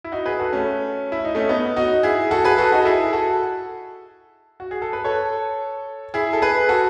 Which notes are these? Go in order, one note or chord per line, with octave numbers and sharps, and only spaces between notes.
E4
D#4 F#4
G#4 B4
F#4 A4
A3 C#4
E4
D#4
A3 C#4
B3 D#4
D#4 F#4
E4 G#4
F#4 A4
G#4 B4
F#4 A4
D#4 F#4
A4
E4 G#4
F#4 A4
F#4
G#4
A4
B4
A4 C#5
E4 G#4
A4
G#4 B4
F#4 A4